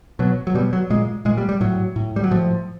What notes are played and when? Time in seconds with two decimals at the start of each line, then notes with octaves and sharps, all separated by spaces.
0.19 B2 F#3
0.47 F#3
0.55 B2 G3
0.73 F#3
0.90 A#2 G#3
1.25 A#2 G#3
1.37 G3
1.49 G3
1.61 A2 F#3
1.96 A2
2.16 G3
2.24 F#3
2.31 A2 F3